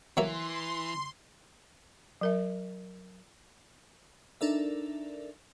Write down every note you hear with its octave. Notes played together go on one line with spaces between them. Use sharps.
E3 F#3 A#3 E5 C6
F#3 A#4 E5
D4 D#4 A4 A#4 D5 E5